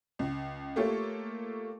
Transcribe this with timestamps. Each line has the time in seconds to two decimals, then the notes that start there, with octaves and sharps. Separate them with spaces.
0.19 C#2
0.76 A3 A#3 F4 G4 A4 C#5